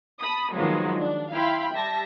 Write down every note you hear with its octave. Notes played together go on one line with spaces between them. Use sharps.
A5 B5 D#6
D#3 F3 F#3 G#3 A#3 B3
D4
E4 F5 G5 B5 C6
G3 E5 A5 A#6